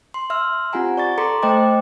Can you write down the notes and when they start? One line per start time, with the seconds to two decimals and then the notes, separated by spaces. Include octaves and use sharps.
0.14 C6
0.30 E5 C6 E6 F6
0.73 C4 F4 G4 F#5 G#5 A#5
0.97 D5 C#6 A6
1.18 A4 A#5 C6 D6 C#7
1.42 A3 C5 D#5 G5 D6